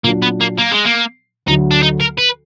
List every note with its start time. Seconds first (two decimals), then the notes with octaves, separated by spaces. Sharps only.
0.04 A#2 F#3 A#3 D4
0.22 B3
0.40 A#3
0.58 A#3
0.71 G#3
0.85 A#3
1.46 D2 D3 F#3 D#4
1.71 D4
1.83 D#4
2.01 A#4
2.19 B4